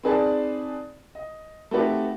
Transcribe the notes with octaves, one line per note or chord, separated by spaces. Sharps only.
C4 D#4 G#4 B4 D5 A5
D#5
A3 C4 D#4 F#4 G4 B4